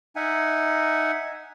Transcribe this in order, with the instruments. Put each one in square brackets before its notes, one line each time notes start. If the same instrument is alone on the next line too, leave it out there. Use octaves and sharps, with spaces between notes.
[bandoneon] D#4 E5 F#5 G#5